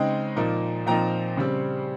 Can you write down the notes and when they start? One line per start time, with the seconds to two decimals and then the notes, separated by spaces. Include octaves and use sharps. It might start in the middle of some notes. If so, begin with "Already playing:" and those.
Already playing: C#3 G#3 C4 D#4 D#5 G5
0.36 A#2 F3 A#3 D#4
0.86 A#2 F3 C4 D#4 G5 A#5
1.37 C#3 G3 C4